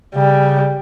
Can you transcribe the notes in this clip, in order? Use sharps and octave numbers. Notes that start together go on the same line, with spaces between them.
C#3 G3